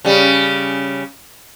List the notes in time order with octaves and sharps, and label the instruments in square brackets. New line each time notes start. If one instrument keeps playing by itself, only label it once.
[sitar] C#3 G3